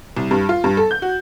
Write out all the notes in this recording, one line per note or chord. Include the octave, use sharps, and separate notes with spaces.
C2
G2
F4
G2
A4
G6
F#4